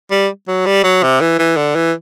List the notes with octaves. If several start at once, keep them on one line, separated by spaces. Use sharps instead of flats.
G3
F#3
G3
F#3
C3
E3
E3
D3
E3